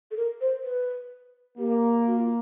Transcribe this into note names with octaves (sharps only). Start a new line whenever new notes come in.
A4
A#4
C5
B4
A#3 G4
F#4
F4